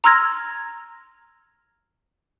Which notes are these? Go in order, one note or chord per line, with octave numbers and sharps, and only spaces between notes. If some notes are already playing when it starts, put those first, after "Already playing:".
A#5 C6 E6 F6 G#6 A#6